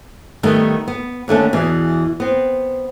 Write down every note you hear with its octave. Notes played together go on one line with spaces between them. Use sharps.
D#3 G3 A3 B3
B3
D#2 D3 A3 C#4
E2 B2 E3
B3 C4